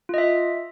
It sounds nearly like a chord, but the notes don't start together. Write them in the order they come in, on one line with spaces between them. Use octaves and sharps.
F4 D#5 E5